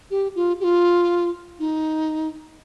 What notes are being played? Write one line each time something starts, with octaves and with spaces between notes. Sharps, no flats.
G4
F4
G4
F4
D#4